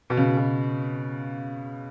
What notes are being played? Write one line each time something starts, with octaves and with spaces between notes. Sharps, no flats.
B2
C#3
B2